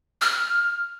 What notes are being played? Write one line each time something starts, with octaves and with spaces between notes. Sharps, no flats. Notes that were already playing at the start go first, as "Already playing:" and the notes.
F6